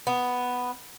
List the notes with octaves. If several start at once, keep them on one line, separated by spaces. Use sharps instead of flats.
B3